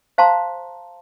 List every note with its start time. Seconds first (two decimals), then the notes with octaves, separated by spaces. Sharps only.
0.18 C5 F5 A5 A#5 C6